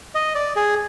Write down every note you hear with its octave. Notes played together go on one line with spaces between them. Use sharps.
D#5
D5
G#4